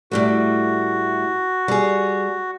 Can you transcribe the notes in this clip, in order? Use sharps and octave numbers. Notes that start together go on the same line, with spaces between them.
A2 G3 A3 F#4
G3 G#4